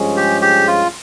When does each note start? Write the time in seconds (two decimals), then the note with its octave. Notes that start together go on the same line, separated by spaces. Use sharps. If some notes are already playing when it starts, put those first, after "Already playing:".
Already playing: G2 F3 G#3 C#4 G#4
0.17 G4
0.42 G4
0.67 F4